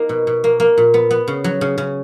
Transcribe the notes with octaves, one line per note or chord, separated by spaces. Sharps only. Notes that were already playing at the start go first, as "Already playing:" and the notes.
Already playing: A#3 D#4
B2
B2
A#3
A#3
A#2
B3
B3
C#3
F#3
C#3
C#3